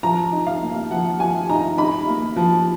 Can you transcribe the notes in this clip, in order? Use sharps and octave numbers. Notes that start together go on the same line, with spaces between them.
F3 A#5
D#4
F5
A#3
F3 F#5
F3 G#5
D#4 A#5
D#4 B5
A#3
F3